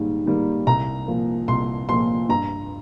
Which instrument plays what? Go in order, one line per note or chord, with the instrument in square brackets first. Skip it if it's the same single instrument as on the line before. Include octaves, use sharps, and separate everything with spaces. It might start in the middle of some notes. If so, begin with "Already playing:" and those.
Already playing: [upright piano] G#2 D#3 G3 A#3
D#3 G3 A#3
C2 A#5
A#2 F3 A#3
C2 C6
A#2 F3 A#3 C6
G2 A#5